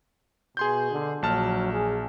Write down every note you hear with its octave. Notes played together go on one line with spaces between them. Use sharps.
B2 G#4 C6 G6
D3
A#1 F#3 A5 F6
G#4